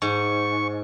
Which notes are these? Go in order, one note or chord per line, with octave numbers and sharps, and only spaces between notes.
G#2 C#6